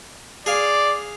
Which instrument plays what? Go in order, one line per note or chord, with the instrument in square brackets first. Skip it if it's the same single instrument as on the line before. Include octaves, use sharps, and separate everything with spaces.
[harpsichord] G#4 F5 [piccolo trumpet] D5